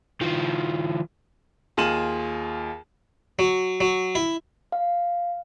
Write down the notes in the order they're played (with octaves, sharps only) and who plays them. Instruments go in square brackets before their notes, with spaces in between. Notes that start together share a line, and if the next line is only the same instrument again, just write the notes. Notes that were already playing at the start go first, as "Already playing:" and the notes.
[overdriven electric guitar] D#3 F3
[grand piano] D#2 F4 G#4 D#7 E7 F#7
[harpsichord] F#3
F#3
E4
[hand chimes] F5